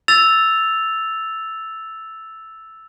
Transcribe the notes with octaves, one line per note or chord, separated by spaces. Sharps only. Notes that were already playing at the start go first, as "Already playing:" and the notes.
E6 A6 F7